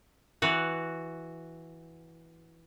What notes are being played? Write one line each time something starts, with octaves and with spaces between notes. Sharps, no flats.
E3 F#4